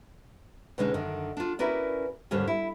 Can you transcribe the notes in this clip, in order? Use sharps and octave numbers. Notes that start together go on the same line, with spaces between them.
B2 D3 G#3 C#4 D#4 G#4
F#2 D3 D#3
D4 F4
C#4 E4 F#4 A#4 B4 D5
D#2 G#2 D3 G3 C#4
E4